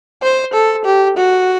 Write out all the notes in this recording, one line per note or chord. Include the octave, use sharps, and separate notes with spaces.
C5
A4
G4
F#4